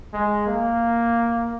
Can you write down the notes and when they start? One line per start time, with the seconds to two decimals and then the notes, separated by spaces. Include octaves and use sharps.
0.13 G#3
0.47 A#3